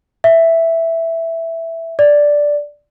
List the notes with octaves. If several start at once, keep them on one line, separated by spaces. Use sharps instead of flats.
E5
D5